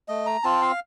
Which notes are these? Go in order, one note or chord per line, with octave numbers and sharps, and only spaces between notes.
A3 D#5
A#5
C4 F4 A5
F5